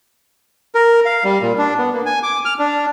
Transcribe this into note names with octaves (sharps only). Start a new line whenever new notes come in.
A#4
F5
G3
A#2
D4
B3
A#3
G#5
D6
F6
D4